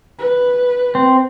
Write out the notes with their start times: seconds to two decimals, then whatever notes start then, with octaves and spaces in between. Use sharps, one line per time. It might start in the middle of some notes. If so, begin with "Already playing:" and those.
0.19 B4
0.95 C4